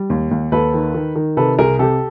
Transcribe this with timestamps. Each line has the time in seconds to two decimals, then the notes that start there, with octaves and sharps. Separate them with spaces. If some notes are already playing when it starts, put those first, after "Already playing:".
Already playing: G3
0.10 D#2
0.31 D#2
0.52 D#2 A4 B4
0.74 D#3
0.94 D#3
1.16 D#3
1.37 C3 A4 B4
1.58 C2 G#4 A#4
1.79 C3 G4 A4